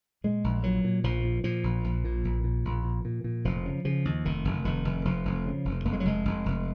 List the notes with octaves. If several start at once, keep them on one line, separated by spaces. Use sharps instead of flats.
A#2 G#3
A#1
A#2 F#3
A#2
A#1 F3
A#2
A#2 F3
A#1
A#1
A#2
A#1
A#2
A#1
A#2
A#2
A#2
F1 F3
C#3
C#3 F3
D#2
F1 D#3
F1
F1 D#3
F1
F1 F3
F1
C#3
F1
F1 A#3
G#3
F#3
F1 G#3
F1
F1